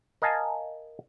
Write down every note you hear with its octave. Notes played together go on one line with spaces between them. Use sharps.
A#4 D#5 F5 G#5 A5